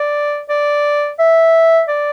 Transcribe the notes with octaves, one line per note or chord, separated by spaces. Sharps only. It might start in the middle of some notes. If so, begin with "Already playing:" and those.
Already playing: D5
D5
E5
D5